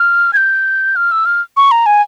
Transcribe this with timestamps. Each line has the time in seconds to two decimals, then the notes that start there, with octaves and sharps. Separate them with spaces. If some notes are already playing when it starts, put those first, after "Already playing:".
Already playing: F6
0.33 G#6
0.37 G6
0.96 F6
1.12 E6
1.26 F6
1.57 C#6
1.71 A#5
1.86 G#5